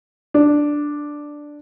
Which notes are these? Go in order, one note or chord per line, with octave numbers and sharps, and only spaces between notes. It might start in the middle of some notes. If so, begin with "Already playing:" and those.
D4